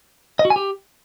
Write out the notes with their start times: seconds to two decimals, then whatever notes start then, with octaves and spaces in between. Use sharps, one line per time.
0.39 D#5
0.45 F#4
0.50 G#5
0.56 G4